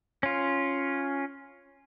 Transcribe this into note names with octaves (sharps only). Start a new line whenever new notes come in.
C#4 F4